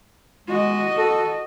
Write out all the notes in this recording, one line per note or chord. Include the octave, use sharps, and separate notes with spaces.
G#3 F#4 D#5
A4